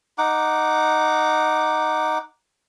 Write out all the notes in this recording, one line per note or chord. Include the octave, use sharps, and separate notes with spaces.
D#4 F#5 D6